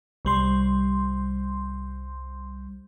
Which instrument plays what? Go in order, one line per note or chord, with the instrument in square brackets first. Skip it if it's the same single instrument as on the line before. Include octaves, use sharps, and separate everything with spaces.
[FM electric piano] C2 G3 C6